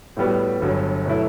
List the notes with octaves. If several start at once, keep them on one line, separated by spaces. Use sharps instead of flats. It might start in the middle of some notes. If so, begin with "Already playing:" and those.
A2 G3 B3 F#4
G1 G2 F#3
B2 F#3 A3 E4